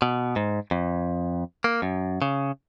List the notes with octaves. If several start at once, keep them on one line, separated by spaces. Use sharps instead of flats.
B2
G#2
F2
A#3
F#2
C#3